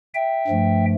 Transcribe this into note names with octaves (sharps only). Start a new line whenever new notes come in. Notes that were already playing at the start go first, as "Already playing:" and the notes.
E5 G5
G2 F3 A3